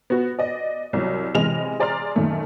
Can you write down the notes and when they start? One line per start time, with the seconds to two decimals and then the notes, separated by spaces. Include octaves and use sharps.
0.10 B3 F#4
0.39 D5 D#5
0.93 C2 F#3
1.35 C3 E3 G#3 D#5 F6 F7
1.80 G#4 D5 A#5 C6 F6
2.16 F#2 A#2 D#3 A3